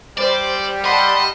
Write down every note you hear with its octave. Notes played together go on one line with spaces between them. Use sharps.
G3 C5 D5
D#5 F#5 A5 B5 C6